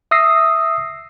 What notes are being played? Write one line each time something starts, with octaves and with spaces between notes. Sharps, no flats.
E5 D#6 E6 A#6 C7